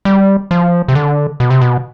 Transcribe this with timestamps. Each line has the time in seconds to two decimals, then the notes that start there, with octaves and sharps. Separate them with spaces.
0.05 G3
0.51 F3
0.88 C3
0.95 D3
1.40 B2
1.50 C3
1.61 B2